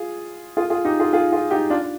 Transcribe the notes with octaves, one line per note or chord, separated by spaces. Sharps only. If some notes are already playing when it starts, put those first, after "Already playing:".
Already playing: F4 G#4
F4 G#4
F4 G#4
D#4 G4
F4 G#4
F4 G#4
F4 G#4
D#4 G4
D4 F4